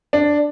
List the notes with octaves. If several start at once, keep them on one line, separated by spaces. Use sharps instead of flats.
D4